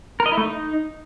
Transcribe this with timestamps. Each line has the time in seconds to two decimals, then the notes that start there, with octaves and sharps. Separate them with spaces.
0.20 A#4
0.26 D#5
0.32 E4
0.37 A3
0.43 D#4